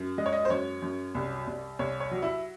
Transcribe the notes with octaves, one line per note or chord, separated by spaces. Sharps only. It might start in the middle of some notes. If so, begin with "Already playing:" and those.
Already playing: F#2
G#3 D#5
C#5
D#5
C5
F#2 C#5
F#2
C2
C2
C2 C#5
C#5
F#3
E4